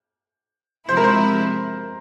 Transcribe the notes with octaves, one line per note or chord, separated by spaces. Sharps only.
C3 F3 G#3 E4 C5
A#4
C5